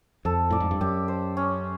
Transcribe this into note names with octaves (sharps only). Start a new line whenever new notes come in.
F2 A4
A2 D5
G#2
G2
F#2 G4
C5
C#4